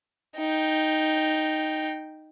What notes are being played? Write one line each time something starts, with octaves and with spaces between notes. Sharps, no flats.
D#4 G5